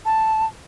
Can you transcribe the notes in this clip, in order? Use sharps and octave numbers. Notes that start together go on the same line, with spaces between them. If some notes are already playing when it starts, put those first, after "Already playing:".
A5